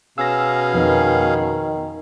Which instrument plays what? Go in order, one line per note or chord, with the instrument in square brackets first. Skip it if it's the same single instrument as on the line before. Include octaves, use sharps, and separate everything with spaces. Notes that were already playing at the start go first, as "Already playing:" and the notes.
[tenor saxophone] B2 [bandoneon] C#4 G#4 F5 [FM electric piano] E6 A#6
[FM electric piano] F2 B3 [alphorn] D#3